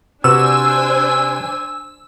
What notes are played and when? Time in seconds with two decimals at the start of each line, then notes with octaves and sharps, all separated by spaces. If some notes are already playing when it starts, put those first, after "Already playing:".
0.24 C3 D4 F#4 B4 C5 G#5 E6